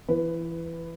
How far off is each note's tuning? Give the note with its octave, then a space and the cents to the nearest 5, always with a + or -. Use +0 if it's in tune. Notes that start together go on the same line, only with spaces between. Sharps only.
E3 +20 B4 +10